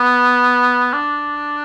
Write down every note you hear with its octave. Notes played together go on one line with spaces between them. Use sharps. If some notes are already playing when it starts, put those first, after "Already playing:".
Already playing: B3
D4